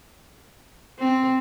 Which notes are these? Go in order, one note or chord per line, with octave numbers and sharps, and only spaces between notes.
C4